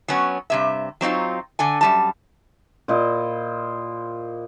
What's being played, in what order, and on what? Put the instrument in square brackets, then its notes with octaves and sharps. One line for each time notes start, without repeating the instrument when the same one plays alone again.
[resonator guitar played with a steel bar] F#3 B3 C#4
G2 C3 E5
F#3 C4 D#4 F4
D3 A4 G#5
F#2 G3 A5
[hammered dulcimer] A#2 E4 C5 D#5